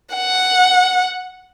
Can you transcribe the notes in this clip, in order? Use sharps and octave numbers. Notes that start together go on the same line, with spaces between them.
F#5